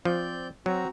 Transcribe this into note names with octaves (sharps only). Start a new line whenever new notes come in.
F3 C4 D5 G6
F#3 C4 F#4 A#5